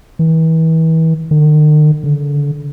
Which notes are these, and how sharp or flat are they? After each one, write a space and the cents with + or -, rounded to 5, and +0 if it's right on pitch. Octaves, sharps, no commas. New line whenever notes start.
E3 -35
D#3 -45
D3 -30